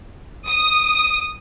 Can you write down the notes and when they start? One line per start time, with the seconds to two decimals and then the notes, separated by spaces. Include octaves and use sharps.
0.48 D#6